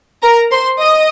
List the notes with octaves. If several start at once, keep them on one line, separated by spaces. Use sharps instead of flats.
A#4 A#5
C5 C6
D#5 D#6